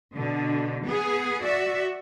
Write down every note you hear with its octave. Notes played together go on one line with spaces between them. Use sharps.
B2 D3
B3 G#4
F#4 D5 E5